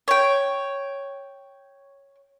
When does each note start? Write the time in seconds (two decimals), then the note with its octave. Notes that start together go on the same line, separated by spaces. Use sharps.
0.08 C#5 G5